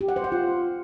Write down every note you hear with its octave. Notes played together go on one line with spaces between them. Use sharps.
G4
F#5
C5
F#5
F4